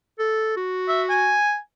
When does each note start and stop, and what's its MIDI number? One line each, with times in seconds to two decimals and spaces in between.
0.19 0.53 69
0.57 1.37 66
0.88 1.02 76
1.10 1.56 80